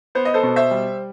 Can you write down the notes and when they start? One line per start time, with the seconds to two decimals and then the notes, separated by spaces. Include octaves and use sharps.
0.15 B3 C5
0.25 D#5
0.34 A4 C5
0.43 B2
0.56 C5 E5
0.71 G3